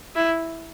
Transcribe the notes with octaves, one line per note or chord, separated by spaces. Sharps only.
E4